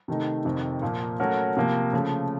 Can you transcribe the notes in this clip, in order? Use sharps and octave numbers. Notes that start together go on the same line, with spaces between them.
C3 D#3 A3 D#4
F2 C3 D#3
A#2 F3 A#3
F#3 A3 C#4 F#4 A#4
C3 F3 A#3
C#3 F3 A3